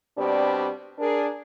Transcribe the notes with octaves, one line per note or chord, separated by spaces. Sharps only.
B2 G3 C4 D4 G4
D4 G#4 A#4